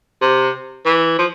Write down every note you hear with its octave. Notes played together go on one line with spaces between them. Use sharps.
C3
E3
F3